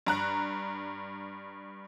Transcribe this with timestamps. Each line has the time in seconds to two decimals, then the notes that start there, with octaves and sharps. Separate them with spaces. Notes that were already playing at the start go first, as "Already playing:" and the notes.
0.07 G2 A#5 F#6